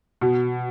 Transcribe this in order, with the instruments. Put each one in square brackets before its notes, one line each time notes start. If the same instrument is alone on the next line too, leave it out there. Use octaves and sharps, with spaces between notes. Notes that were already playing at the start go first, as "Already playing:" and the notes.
[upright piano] B2